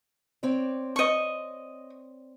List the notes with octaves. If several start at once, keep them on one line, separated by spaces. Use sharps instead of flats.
C4 C#5 D5
D#5 C#6